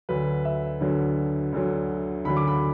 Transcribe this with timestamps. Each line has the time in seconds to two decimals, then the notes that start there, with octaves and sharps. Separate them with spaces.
0.09 D2 D3 F#3 B4
0.45 E5
0.81 D2 D3 F#3
1.52 D2 D3 F#3
2.25 D2 D3 F#3 B5
2.37 D6
2.48 B5